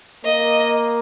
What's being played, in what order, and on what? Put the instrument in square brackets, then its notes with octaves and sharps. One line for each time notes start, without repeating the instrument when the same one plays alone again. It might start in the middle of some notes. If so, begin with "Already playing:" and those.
[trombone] A#3 [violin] D#5